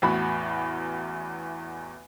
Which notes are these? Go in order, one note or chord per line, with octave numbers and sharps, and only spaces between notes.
A1 E2 F#4 B5